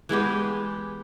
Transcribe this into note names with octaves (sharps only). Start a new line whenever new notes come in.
E3 G#3 B3 G4